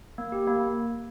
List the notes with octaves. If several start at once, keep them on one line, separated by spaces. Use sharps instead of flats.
A#3
G4
A#3